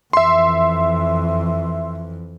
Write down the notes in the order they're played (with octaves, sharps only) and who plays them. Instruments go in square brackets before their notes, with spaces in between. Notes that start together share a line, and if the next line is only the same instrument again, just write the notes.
[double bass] F2 E3 [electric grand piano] E5 C6